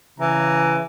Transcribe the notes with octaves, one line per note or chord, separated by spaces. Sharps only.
C#3 E3 A#5